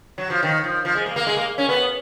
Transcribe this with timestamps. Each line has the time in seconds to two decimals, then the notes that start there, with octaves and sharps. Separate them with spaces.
0.18 F#3
0.30 F3
0.43 D#3
0.64 F3
0.85 F3
0.95 G#3
1.06 A#3
1.16 A#3
1.27 G#3
1.36 A#3
1.58 C#4
1.69 B3